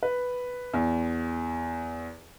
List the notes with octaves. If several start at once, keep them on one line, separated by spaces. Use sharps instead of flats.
B4
E2